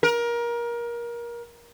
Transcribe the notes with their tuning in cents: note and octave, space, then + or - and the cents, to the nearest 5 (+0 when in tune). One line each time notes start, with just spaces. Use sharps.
A#4 +25